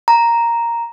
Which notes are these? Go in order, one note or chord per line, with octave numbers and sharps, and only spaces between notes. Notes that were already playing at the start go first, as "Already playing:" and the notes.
A#5